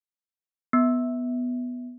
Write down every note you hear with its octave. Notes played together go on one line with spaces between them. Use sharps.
B3